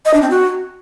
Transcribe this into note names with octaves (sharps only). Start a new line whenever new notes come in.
D#5
D4
C4
F#4